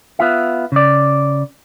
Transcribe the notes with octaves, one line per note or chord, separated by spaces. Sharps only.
B3 F4 E5
C#3 D5